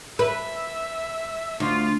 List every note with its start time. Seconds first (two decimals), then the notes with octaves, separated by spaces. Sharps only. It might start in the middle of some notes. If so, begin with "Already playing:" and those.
0.19 B4 E5
1.60 D2 F4